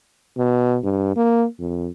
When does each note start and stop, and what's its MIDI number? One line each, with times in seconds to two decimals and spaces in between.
0.37 0.78 47
0.83 1.13 43
1.16 1.46 58
1.60 1.89 41